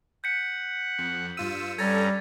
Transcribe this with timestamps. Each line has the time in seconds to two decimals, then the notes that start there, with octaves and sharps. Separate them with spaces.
0.24 F#5 G6 B6 C#7
0.98 F2
1.37 G2 F4 E6 D#7
1.78 G2 G3 C#4 A4 A#5 G#6 A6